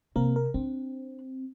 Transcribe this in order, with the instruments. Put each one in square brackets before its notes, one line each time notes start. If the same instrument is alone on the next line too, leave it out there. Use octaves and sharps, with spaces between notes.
[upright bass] C3 [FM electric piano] A#3 C4 A#4
[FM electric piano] A#4
[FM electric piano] C4 [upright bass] D4